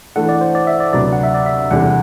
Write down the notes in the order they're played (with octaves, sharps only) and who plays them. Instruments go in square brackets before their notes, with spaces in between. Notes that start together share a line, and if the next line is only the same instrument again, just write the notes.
[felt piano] E3 A3 D4 A4 [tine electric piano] F#5
[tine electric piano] D5
C5
D5
E5
D5
[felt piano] D2 C3 F#3 B3 [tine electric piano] D5
[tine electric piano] F#5
E5
D5
E5
[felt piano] E2 C3 G3 D4 A4 [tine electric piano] F#5